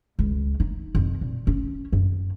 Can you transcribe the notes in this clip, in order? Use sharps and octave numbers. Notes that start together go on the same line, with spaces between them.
C#2
D#4
F2
A#2
C#4
F#2